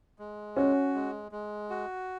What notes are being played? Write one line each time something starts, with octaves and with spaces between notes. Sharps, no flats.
G#3
C#4 F#4
G#3
G#3
F#4